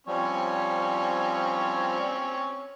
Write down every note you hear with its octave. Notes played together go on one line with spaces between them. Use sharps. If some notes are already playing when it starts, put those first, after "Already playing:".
F3 G3 C4 C#4 C#5